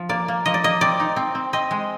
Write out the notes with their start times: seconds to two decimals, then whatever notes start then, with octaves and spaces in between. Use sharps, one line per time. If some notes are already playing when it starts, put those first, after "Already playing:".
Already playing: F3
0.09 A#3 D5
0.28 A#3
0.46 F3 D#5
0.54 D5
0.64 A#3 D#5
0.81 C4 D5
1.00 D#4
1.16 C4
1.35 C4
1.53 C4 D#5
1.71 G#3